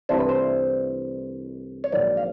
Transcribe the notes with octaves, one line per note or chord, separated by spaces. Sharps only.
C2 C3 E3 A3 D4 C5
B4
C5
C#5
A#1 G#2 D#3 F#3 D5
F5